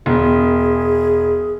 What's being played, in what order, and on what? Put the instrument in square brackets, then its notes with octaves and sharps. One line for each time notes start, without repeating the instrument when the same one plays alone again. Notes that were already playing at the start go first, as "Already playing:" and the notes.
[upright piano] E1 [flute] G#4